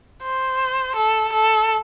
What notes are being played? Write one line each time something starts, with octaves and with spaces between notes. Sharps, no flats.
C5
A4
A4